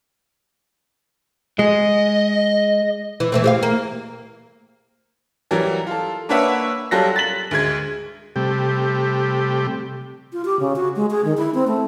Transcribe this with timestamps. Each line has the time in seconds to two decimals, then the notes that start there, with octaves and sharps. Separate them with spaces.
1.59 G#3 D#5
3.20 E3
3.32 E3 A3 C4
3.44 G4 G#4 F5
3.63 A#3
5.51 E3 F#3 G3 A#4
5.87 F4 A4
6.29 A#3 D4 B4 C#5 E5 F#5
6.91 F#3 G3 F4 A4 F#6 A#6
7.16 A6 B6 F#7
7.51 D2 G#3 G#6
8.36 C3 G3 A3 G4
10.32 F4
10.45 G4
10.60 C#3
10.76 F#4
10.96 G#3
11.11 G#4
11.25 D#3
11.37 E4
11.54 C4
11.67 A3